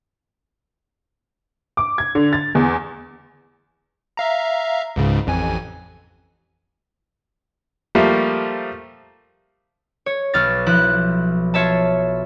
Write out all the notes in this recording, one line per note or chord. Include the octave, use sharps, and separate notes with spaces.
D6
G#6
D3
A6
E2
E5 F5 A#5
C#2 G#2 C#3
A1 F2 G#5
F3 G3 A3 A#3
C#5
B1 F6 A6
F3 E4 F#6
F4 C#5 E5 A5